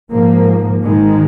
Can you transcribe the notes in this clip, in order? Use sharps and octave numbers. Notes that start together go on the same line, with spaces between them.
G#2 F3 A#3
G#1 G#2 D#3 G#3